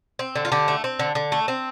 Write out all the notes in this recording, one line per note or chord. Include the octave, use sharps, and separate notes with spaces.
C4
D3
F4
D3 G4
A3
C4
D3
D3
A3
C4